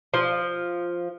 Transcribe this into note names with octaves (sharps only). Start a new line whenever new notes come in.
F3